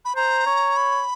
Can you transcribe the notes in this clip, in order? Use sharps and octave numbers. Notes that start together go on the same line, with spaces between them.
B5
C5 A#5
C#5
B5